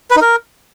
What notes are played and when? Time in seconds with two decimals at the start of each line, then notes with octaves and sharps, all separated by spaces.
0.11 B4
0.16 D#4
0.22 A#4